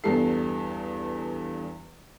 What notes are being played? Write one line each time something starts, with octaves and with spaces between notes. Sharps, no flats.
E2 G2 G3 A4 C7